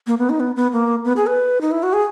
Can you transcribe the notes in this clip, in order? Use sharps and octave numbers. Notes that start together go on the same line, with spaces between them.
A#3
B3
D#4
B3
B3
A#3
B3
G#4
B4
D#4
E4
F#4
G#4